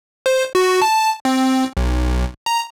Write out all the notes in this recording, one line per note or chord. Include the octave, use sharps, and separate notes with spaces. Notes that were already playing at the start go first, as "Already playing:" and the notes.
C5
F#4
A5
C4
B1
A#5